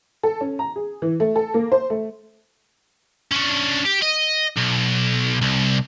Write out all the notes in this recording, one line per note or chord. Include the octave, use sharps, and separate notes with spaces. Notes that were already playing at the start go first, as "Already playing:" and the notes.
A4
C#4
A#5
G#4
E3
A3
A4
A#3
C5
A3
C#4 D4
G4
D#5
B1
C2